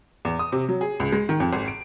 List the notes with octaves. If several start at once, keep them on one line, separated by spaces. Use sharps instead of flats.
E2
D#6
C3
F#3
G#4
C#2
G#3
D#3
F2
G#1
D7